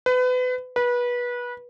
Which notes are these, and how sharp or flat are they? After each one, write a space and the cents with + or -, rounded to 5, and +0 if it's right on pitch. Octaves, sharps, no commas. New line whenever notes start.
B4 +30
B4 -25